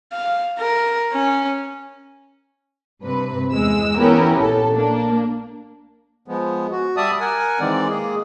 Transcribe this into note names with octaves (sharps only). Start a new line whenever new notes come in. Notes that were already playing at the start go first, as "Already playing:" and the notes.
F5
A#4
C#4
G2 C3 B4
E2 G#3 E6
E3 B3 C#4 E4 G4 A#4
A#1 A4
A#3 D4
F3 G#3 B3
F#4
G3 D5 E5 A5 D#6
A#4 F#5 G#5
D#3 E3 G#3 C4 D5
G#3 A#3 G#4